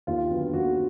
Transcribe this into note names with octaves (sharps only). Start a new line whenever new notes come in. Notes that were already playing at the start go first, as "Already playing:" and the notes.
D#2 F4
D3 F#3 B3
D#2 F#4